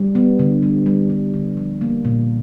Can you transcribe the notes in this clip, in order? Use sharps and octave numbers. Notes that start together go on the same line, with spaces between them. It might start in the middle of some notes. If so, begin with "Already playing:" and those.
Already playing: G3
B3
D3
G3
G3
G3
D3
F3
A#3
A#2